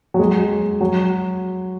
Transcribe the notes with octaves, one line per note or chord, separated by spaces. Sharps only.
F#3
G#3
F#3